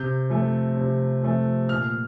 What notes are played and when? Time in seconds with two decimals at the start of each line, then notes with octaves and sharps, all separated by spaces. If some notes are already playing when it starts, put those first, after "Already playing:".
Already playing: C3 G6
0.30 F3 A3 C4
0.77 C3
1.23 F3 A3 C4
1.69 A#2 F6